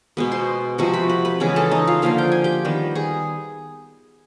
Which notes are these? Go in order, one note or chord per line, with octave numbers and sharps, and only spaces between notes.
B2 G#3 B3
C5 C6
C3 F3 G#3 F#4 F#5
B4 B5
B4 B5
B4 B5
C#3 E3 G#3 B3
A4 A5
D#4 D#5
F4 F5
D3 F3 A#3 F4 F5
G5
G#5
G4 G5
D#3 G3 B3
G#4